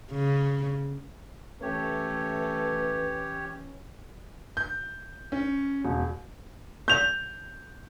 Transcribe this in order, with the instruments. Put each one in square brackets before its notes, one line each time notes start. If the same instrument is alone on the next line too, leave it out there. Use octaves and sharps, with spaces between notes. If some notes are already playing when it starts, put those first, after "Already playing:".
[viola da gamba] C#3
[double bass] E3 C#4 [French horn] A3 [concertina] G4 C#5 [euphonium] B4
[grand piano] G6
C#4
E1
G6 F7